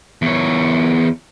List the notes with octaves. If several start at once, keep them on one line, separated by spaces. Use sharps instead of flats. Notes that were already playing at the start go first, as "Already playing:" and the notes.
E2 C#5